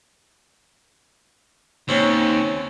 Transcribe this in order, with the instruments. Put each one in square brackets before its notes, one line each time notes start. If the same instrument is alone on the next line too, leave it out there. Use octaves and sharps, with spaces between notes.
[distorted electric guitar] D#2 [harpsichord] C4 C#4